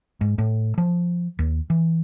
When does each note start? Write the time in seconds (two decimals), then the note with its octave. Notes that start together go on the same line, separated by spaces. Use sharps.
0.21 G#2
0.38 A2
0.78 F3
1.39 D#2
1.70 E3